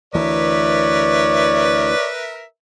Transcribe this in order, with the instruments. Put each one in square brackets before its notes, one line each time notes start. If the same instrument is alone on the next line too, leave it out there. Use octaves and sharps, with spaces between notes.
[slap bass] D2 E3 [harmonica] A#4 B4 E5 [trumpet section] C#5 D5